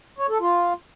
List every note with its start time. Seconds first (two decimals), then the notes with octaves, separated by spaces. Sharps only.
0.19 C#5
0.29 A4
0.40 F4